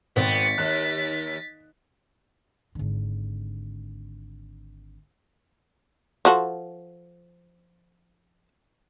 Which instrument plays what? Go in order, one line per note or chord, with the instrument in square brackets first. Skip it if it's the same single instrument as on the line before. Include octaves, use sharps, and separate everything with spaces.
[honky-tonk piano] G#1 [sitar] B3 C4 [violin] A6 B6
[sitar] D#2 [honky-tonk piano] F#6
[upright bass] G#1 D3
[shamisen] F3 F#4 A4